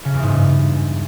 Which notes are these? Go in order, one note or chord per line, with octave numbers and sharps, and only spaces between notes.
C#3
E2
G#2
G2